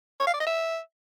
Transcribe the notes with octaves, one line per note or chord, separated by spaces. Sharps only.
C#5
F5
D5
D#5
E5